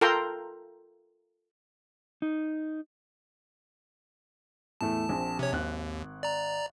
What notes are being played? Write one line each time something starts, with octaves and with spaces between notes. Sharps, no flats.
F4 A4 A#4 G5 A#5 C6
D#4
E2 A2 A3 A5
A#1 C4
C3 C#5
G#1 D#2 F#6
D5 A#5